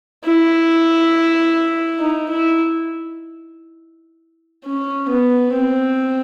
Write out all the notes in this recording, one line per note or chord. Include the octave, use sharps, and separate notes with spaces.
E4
D#4
E4
C#4
B3
C4